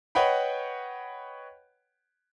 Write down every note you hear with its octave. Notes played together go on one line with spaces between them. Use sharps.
B4 C#5 D#5 F#5 G5 B5